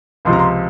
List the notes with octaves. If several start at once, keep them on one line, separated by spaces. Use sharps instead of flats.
C#2 C3 F3 C6
A#5
C6